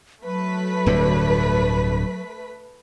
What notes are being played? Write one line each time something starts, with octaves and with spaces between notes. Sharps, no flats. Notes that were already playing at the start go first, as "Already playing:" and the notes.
F#3 A3 B4 B6
D1 G2 D3